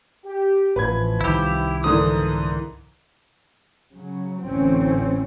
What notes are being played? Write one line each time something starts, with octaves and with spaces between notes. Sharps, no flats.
G4
A1 B2 E3 F3 B4 B5 G#6
C2 D#3 E4 G4
G#2 D3 E3 A#4 D#6
C#3 F#3
A1 D2 E3 C4 C#4